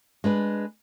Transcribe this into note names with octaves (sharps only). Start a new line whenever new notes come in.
G#3 D4 B4